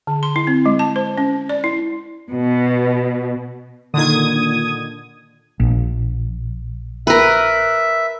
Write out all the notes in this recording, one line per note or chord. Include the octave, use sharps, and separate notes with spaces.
D3
C6
E4
C4
G#3
A5
C5
C#4
D5
E4
B2
A#2 D3 D#3 D#6 G#6
A#1
A#4 B4 E5